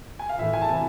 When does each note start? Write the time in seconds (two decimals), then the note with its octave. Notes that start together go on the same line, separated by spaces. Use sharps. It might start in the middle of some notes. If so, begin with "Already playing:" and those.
0.19 G#5
0.29 F5
0.39 A2 E3 A3 E5
0.53 G#5
0.62 A5
0.69 C3 E3 G#5